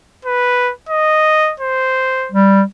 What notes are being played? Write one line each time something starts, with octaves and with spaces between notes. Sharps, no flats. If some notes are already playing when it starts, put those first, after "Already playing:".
B4
D#5
C5
G3